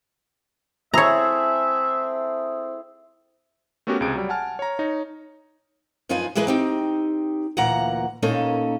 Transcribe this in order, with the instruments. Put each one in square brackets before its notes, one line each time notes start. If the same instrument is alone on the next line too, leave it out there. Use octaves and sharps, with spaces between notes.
[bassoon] C4 [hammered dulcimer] E4 G#4 A4 [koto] C#5 A#5 [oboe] E5
[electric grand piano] A3 B3 C#4 F#4 G4 A#4
C#2 C3 G#4 D7
F#3 G3
F#5 G#5 A5 F6
C#5 A#5
D#4 C#5 A#6
[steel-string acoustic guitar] F#2 F3 D#4 F4 B4 G#5
E3 G#3 A#3 G#4 B4 D#5
C4 D#4 G4
D2 A#2 E3 A#3 F#5 A#5
A#2 A#3 C#4 D#4 A4